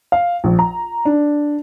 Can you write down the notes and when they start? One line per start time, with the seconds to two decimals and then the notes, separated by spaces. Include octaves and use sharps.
0.12 F5
0.44 A#1
0.59 A#5
1.05 D4